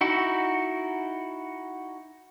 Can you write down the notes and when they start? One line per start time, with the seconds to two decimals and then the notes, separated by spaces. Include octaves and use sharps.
0.01 D#4 E4 F#4